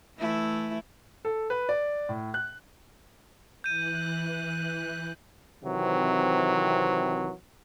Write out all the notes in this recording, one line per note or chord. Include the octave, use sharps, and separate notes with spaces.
E3 A3 E4
A4
B4
D5
A2
F#6
E3 F#6 G6 D#7
C3 D#3 E3 F#3 C4